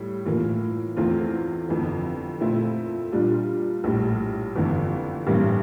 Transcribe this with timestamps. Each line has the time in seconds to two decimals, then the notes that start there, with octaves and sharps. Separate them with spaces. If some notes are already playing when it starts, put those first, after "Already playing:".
Already playing: A2 G3
0.25 A2 E3 A#3 F4
0.97 E2 E3 A3 C4 F4
1.69 G1 F2 E3
2.41 A#2 A3 C4 E4
3.12 A#2 G3 D4 F4
3.84 A#1 A2 G3
4.55 G1 F2 E3
5.27 A1 G2 E3 G3 A#3